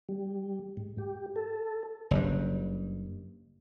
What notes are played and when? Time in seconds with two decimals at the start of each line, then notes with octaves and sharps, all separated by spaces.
0.09 G3
0.77 G#2
0.98 G4
1.36 A4
2.11 F#1 G2